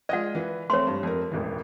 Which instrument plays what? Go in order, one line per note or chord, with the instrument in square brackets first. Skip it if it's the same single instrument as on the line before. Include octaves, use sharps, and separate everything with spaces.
[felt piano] G#3 F4 D#5 [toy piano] D5 F#5
[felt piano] E3 B4
[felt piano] A3 C4 [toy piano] C#5 C6
[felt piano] G2
F2 A#4
E1 A1 E3